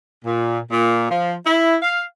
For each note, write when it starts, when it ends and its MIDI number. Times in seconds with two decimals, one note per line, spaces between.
0.25 0.59 46
0.71 1.06 46
1.09 1.33 53
1.45 1.75 64
1.82 2.03 77